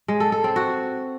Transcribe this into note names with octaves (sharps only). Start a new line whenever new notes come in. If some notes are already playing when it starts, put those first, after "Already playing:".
G#3
A4
A4
C4
F#4